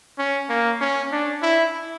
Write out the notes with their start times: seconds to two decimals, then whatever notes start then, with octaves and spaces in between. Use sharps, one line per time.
0.18 C#4
0.49 A#3
0.81 C#4
1.12 D4
1.43 E4